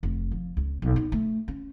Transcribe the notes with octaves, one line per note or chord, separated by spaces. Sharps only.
F1
F3
C#2
B1
D#4
A3
C#4